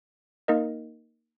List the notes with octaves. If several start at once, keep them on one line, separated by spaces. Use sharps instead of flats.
A#3 D#4 A#4 D#5